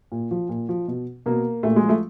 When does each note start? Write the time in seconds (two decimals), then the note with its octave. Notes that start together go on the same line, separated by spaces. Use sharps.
0.12 A#2
0.31 F3
0.49 A#2
0.69 F3
0.88 B2
1.26 B2 A#3
1.63 A#2 A3
1.76 G#3
1.83 F3
1.89 A3